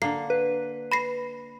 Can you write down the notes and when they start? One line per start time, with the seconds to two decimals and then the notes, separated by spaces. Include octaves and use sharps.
0.02 D3 A#3 C7
0.30 B4
0.92 B5 A#6 C7